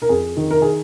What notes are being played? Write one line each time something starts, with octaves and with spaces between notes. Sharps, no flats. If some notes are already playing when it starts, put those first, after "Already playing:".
A#4
F2 G#4
D#3
A#4
G#4